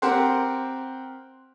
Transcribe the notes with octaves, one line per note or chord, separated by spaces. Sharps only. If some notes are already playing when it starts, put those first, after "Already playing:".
C4 G4 A#4 C5 F#5